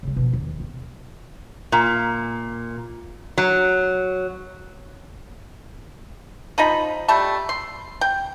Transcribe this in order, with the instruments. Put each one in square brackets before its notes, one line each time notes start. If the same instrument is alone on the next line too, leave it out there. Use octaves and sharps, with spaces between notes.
[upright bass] C#3 G3
B2 F3
D#2
C4
[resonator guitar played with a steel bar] A#2
F#3
[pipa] F3 D#4 D#5 B5
G3 A3 A5
C6
G5